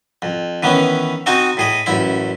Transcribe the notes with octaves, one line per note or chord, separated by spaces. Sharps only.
F2
D#3 E3 B3 C#4
C4 D#4 F#4 D#5 G#5
A2 G#4 D#5
A1 F#2 E4 B5